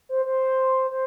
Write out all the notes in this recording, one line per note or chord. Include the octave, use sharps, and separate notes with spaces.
C5
C5
C5